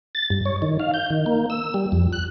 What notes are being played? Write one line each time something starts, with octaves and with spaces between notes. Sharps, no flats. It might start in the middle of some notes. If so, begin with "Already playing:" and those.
A6
G2
C#5
D#3
F5
G6
D#3
A#3
E6
G3
F2
F#6